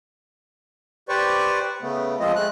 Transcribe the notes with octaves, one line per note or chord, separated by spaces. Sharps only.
G4 B4 C5 D5 C#6
C#3 A3 B3
F3 G#3 C4 F4 D#5
G#3 A3 F#6